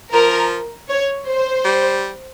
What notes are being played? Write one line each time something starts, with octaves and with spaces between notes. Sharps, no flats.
F3 A#4
C#5
C5
G3